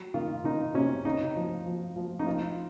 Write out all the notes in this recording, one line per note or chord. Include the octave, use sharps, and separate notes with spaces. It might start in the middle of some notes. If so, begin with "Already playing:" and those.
Already playing: F#3
D#3 F4
D#3 D#4
C3 C#4
C#3 D#4
F3
F3
F3
D#4
F3 F4